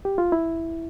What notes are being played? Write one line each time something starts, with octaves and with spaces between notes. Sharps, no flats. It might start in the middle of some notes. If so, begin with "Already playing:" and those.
G4
F4
E4